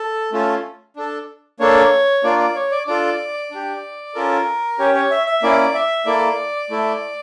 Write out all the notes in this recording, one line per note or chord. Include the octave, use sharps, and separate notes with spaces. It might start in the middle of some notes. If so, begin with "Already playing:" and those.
Already playing: A4
A3 C#4 F4 A4
D4 A4
A#3 D4 A4 C#5
A#3 D4 F4 D5
D5
C#5
D5
D4 F4 A4 D5
D4 G4
C#4 F4 A4 A#4
C#4 G4 C#5
C#5
E5
E5
A#3 C#4 E4 D5
E5
A#3 E4 A4 D5
A3 E4 A4